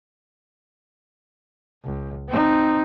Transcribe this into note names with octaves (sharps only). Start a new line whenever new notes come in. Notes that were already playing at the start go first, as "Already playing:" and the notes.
C#2
C4 D#4